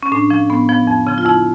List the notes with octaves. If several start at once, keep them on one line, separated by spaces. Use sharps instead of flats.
C#4
A2 D4
F3 C#4
A2 B3
F3 B3
F2
C#3 F3
F4
F2 E4